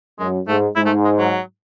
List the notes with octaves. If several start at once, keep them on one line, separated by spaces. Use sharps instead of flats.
F#2 G#3
G#2 A3
G#2 E4
A3
G#3
F#3